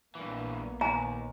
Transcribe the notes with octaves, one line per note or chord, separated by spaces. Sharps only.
A#1 G2 E3 A#3 B3
D#2 G#5 A#5